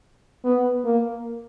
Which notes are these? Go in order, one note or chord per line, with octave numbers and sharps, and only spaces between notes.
B3
A#3